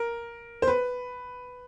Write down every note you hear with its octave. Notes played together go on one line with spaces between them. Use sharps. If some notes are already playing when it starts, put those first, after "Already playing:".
Already playing: A#4
C5
B4